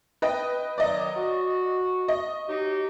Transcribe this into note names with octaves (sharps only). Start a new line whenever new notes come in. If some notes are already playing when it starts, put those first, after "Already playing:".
B4 D#5 G5
D#3 F#3 D5 D#5
F#4
D#5
F#3 D#4 G4